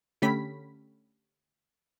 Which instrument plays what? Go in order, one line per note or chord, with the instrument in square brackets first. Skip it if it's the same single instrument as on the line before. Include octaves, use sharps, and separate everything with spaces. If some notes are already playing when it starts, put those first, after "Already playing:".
[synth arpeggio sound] D3 A3 C#4 G4 B5 B6